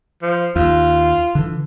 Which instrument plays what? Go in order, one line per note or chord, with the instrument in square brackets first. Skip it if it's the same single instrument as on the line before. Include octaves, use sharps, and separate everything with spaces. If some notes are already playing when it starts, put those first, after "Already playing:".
[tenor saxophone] F3
[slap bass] D#2 [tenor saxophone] F4
[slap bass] D3 E3